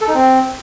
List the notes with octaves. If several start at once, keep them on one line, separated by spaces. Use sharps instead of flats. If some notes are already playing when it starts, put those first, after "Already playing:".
A4
D#4
C4